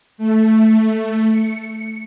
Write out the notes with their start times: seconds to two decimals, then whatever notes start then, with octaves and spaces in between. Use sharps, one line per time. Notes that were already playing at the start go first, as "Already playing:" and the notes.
0.18 A3
1.31 C#7